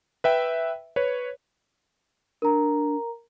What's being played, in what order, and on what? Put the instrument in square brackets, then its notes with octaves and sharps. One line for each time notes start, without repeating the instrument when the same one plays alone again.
[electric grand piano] B4 E5 G5
B4 C#5
[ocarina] D4 [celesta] A#4 A#5